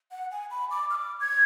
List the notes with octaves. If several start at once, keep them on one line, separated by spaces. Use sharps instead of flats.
F#5
G#5
B5
D6
F6
D6
G#6